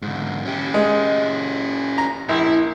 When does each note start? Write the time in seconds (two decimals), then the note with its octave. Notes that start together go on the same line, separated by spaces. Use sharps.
0.02 G#2 D3
0.45 C#4 G4
0.74 G#3
1.98 A#5
2.29 A#1 E4